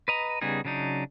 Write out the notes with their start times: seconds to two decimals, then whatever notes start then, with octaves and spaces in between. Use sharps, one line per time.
0.08 B4 D#5 A#5
0.42 C#3 G3 B3 D#4 G#4
0.65 C#3 F#3 D4 D#4